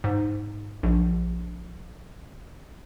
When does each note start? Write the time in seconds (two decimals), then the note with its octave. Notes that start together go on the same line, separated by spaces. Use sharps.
0.04 G#2
0.83 A#1